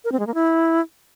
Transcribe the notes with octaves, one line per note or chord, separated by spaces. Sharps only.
A#4
C4
G#3
A#3
E4